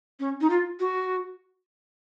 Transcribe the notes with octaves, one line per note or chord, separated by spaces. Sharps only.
C#4
D#4
F4
F#4